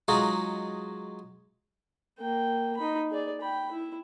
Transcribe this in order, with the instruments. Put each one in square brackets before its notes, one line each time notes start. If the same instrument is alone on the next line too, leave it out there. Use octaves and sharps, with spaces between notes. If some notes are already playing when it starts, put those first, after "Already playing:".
[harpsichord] F#3 G#3 D#4 F4 F#4 G#4
[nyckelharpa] A#3 G5
D#4 B5
G#4 D5
G5 B5
E4